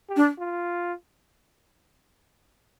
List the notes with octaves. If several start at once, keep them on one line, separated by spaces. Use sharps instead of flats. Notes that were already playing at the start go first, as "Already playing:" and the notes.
G4
D4
F4